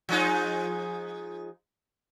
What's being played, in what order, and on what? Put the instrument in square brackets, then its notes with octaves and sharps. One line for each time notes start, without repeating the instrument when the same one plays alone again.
[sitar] F3 G#3 D#4